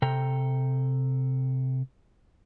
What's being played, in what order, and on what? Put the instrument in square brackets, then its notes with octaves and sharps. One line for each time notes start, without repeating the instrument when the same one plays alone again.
[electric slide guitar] C3 A4 G5 A#5